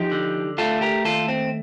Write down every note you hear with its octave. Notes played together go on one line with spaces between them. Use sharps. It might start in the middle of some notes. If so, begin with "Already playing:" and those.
Already playing: F3 D#4 G4
D3
A3 F4 A4
G4 A#4
D#2 F4 A4
C4